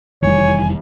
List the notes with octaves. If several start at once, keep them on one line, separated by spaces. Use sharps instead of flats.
F1 E2 D#3 E3 G3 C#5 G#5